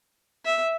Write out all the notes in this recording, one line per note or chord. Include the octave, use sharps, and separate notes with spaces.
E5